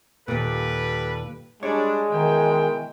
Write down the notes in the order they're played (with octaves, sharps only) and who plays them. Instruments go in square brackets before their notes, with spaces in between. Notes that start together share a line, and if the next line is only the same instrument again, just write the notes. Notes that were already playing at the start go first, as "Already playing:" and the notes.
[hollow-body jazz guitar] D#2 A#2 [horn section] G3 A4 B4
[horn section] G3 D4 [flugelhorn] G#3 [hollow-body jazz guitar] C#5
[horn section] B2 E3 G5 [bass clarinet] D#3